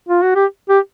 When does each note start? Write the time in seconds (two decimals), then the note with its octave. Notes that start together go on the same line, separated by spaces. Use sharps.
0.08 F4
0.22 F#4
0.35 G4
0.69 G4